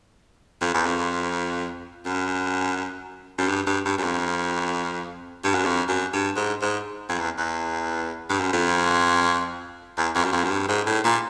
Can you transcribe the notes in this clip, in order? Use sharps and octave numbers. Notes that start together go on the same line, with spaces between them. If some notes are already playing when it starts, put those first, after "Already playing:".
F2
E2
F2
F#2
F#2
G2
G2
G2
F#2
F2
G2
F#2
F2
F#2
G2
G#2
G#2
F2
E2
E2
G2
F#2
F2
E2
F2
F#2
F2
F#2
G2
G#2
A2
A#2